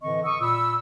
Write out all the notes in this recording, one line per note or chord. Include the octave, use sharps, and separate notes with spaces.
A2 D3 E3 C4 D#5 C#6
C#6 D#6 E6
A#2 B5 E6